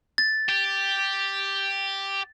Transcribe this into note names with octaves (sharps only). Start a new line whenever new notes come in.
A6
G4